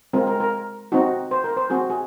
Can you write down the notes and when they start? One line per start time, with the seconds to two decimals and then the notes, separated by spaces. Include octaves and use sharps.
0.13 G#3 C4 F4 A#4
0.27 A#4
0.40 A#4
0.92 C4 D#4 F#4
1.31 C5
1.44 A#4
1.57 C5
1.70 C4 F#4 G#4
1.90 G#4